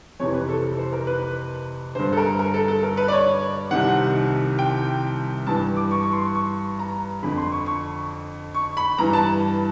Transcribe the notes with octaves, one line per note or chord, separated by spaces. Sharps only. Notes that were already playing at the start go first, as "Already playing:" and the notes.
F2 C3 E3 C#5
B4
A4
A4
C5
A#4
B4
G2 D3 C5
A4
A#4
A#4
A4
A4
A#4
B4
D5
C#5
C2 C3 D#3 F#5
G5
G2 E3 A5
D6
C#6
C#6
C6
C#6
A#5
F2 D3 B5
C6
C#6
C#6
C#6
B5
G2 E3 A#5
A5